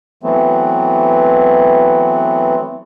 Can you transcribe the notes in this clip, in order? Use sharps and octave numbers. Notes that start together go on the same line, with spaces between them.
E3 F#3 A3 B3 C4